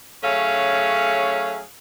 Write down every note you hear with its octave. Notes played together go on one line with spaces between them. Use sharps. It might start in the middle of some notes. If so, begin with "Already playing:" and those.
F#3 A3 C#4 G#4 F5